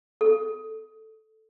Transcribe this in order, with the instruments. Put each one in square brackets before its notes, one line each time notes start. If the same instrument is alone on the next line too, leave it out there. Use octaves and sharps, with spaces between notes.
[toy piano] A4